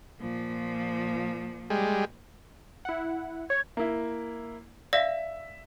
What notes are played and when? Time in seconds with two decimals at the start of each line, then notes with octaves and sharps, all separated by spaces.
0.20 A#2 F3
1.70 G3 G#3
2.85 E4 F#5
3.50 C#5 G#6
3.77 A#3 E4
4.93 D5 E5 F5 A#6